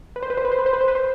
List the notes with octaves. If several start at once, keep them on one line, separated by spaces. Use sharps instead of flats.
B4
C5
B4
C5
B4
C5
B4
C5
B4
C5
B4
C5